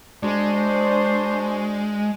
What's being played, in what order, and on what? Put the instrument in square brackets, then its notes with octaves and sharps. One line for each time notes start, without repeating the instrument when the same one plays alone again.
[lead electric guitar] G#3 [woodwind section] D4 F#4 C5